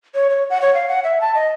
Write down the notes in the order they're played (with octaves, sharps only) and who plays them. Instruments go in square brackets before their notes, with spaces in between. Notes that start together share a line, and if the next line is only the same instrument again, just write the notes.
[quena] C#5
C#5
F#5
C#5
F5
F#5
E5
A5
D#5